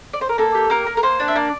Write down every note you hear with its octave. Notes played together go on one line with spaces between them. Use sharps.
D5
C5
A#4
A#3 A4
G4
A#3 A#4
A#3
A#4
A#3 C5
D4
E5
A#3 D5